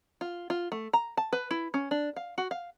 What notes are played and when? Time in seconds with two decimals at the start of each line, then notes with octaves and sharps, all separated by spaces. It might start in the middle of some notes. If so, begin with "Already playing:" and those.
0.21 F4
0.50 F4
0.72 A3
0.93 A#5
1.17 A5
1.33 B4
1.51 E4
1.74 C#4
1.91 D4
2.16 F5
2.38 F#4
2.51 F5